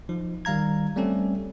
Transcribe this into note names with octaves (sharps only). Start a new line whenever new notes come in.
F3 D#4
D#3 G3 F5 A#5 G#6
G3 A3 C4 C#4 G4 A4